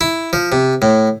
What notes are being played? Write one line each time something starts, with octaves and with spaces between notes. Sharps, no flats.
E4
F3
C3
A2